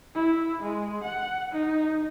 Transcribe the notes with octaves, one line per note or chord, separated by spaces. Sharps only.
E4
G#3
F#5
D#4